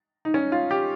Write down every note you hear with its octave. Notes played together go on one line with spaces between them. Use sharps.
D#4
C#4
F4
G4